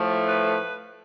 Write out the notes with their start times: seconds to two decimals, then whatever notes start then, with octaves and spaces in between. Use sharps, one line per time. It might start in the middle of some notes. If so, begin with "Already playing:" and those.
Already playing: A2 F3 A3
0.27 B4